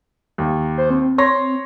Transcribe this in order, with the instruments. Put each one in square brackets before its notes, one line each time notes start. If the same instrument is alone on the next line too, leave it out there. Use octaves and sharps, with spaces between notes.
[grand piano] D#2
[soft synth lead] C5
C4
[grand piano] C#5 C6 A#6